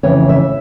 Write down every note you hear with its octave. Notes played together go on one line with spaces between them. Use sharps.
F2 C#3 E3 C#5
E5